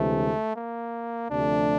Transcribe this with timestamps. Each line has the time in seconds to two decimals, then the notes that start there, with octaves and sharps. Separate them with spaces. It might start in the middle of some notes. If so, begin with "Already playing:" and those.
Already playing: D2 C3 E3 G#3 A3
0.56 A#3
1.30 D2 C3 F3 A3 D4